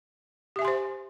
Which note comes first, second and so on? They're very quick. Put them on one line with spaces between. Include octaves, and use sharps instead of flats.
G4 E5 G#5 C6 C5